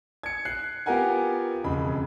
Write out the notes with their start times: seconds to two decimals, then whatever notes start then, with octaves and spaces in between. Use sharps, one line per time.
0.23 G#6 C#7
0.45 F#6 C7
0.86 B3 F4 G4 A#4 F#5 G#5
1.64 E1 F2 C#3 B5